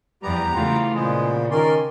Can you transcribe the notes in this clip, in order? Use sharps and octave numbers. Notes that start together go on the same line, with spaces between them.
E2 F3 G3 B3 G4 A#5
C#3 E3 A3 F4
A#2 C#3 F3 G#3 B3
D#3 C#4 A#4 D5 C6